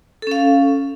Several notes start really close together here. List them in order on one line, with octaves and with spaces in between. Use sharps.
A4 C#4 F5